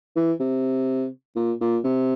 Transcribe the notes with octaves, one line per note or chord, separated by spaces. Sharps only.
E3
C3
A#2
A#2
C3